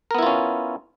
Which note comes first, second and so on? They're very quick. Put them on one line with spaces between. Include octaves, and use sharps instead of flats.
A#4 B3 E4 F4 C#4